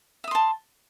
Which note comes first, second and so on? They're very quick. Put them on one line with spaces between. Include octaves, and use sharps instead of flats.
E5 D#6 C6 A5